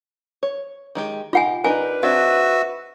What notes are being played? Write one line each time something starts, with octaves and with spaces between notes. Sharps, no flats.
C#5
D#3 G#3 G4
D#4 F4 G4 F#5 G#5
D4 D#4 A#4 B4 G#5
C4 D4 F#4 D#5 E5